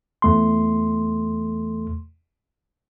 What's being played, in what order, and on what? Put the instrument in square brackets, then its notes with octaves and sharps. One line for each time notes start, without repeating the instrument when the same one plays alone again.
[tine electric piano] E2 A3 C6